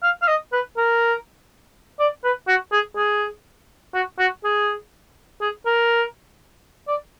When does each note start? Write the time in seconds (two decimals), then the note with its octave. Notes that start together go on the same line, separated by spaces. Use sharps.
0.03 F5
0.22 F5
0.28 D#5
0.53 B4
0.77 A#4
2.00 D5
2.24 B4
2.48 F#4
2.72 G#4
2.97 G#4
3.94 F#4
4.19 F#4
4.44 G#4
5.41 G#4
5.66 A#4
6.88 D5